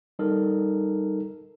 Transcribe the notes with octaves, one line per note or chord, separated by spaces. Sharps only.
G3 D#4 A4 A#4